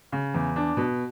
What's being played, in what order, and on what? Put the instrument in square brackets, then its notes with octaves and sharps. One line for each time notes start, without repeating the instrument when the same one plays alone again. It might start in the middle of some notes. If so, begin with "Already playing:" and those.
[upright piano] C#3
E2
D4
B2